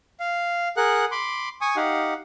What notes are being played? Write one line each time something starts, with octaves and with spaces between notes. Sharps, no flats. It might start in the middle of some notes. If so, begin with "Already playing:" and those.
F5
G#4 A#4 F#5 F#6
B5 C6 D6
G#5 C#6 D#6
D#4 G4 F5 F#5